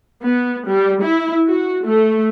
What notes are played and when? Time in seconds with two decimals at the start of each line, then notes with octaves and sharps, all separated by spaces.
0.23 B3
0.67 G3
1.02 E4
1.47 F#4
1.85 A3